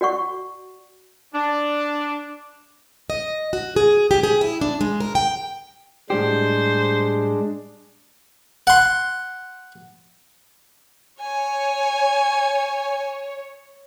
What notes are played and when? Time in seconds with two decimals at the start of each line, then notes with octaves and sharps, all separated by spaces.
0.01 F#4 D5 F#5 C#6
1.34 D4
3.10 D#5
3.53 F#4
3.76 G#4
4.11 G4
4.23 G#4
4.41 E4
4.61 D4
4.81 G#3
5.00 A#4
5.15 G5
6.10 A2 G3 G#3 D4 G4 C5
8.67 F#5 C6
11.21 C#5 G#5